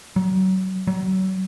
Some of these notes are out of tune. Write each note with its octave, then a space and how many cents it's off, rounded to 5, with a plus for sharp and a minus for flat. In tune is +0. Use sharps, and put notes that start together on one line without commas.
F#3 +30
F#3 +35